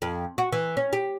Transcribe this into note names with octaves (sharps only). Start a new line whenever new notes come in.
F2
F#4
E3
C#4
G4